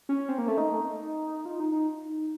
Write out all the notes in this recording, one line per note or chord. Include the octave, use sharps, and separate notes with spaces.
C#4
C4
A#3
A3
D#4
F4
D#4
D#4